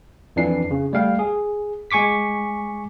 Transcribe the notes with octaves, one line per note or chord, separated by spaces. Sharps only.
F2 E3 D4 C7
C#3
G3 A3 F5 G5
G#4
G#3 G#5 C#6 D6 B6